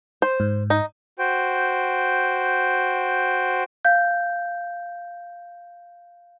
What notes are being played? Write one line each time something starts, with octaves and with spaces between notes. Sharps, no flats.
C5
G#2
D#4
F#4 C5 G5
F5 G6